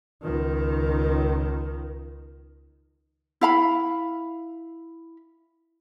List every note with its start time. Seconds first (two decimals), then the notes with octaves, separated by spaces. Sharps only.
0.22 C#2 D#3
3.41 E4 F5 B5